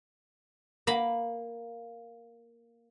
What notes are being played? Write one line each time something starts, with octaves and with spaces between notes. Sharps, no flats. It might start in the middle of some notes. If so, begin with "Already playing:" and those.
A#3 B5